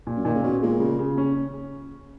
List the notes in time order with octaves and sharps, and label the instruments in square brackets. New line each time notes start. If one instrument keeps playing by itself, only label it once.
[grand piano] A#2
[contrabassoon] F#2
[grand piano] A#2 [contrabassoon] D#3
[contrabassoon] C#3
[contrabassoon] B2 [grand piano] C#4
[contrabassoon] A#2 [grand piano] G#3
[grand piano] C#3
C#3
C#4